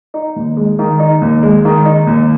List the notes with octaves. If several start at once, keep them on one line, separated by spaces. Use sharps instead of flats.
D#4
D#2
G#3
D#3
D#4
D#2
G#3
D#3
D#4
D#2